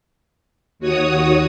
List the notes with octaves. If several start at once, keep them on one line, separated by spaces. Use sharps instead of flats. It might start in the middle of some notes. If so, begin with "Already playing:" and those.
D#2 F#4 C#5 D#6